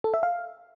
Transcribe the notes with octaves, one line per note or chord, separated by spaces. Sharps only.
A4
E5
F5